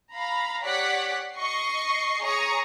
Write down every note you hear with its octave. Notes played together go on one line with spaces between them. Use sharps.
F5 A#5 B5
G4 C#5 D5 F#5 B6
D#5 C#6 C7
G#4 C#5 A#5 C#6 D#6